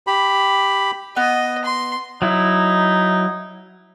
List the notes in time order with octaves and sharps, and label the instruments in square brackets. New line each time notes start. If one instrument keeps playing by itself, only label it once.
[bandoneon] G4 B5
[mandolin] B3 [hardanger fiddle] D#5
[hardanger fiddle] C6
[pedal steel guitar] F#3 E4 [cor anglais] D#4